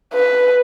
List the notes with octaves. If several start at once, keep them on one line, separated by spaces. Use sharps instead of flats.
B4